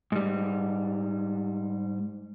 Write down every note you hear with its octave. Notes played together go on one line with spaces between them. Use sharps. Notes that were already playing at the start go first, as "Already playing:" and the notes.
G#2 G3